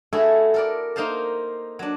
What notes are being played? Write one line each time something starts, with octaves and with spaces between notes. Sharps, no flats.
A3 E4 F#4 G#4 A4
A4 A#4 D5
A#3 D#4 C5 F5 A5
F#3 D4